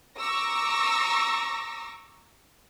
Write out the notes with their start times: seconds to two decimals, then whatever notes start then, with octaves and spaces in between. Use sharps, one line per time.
0.18 A#5 C#6 D6 E6 A#6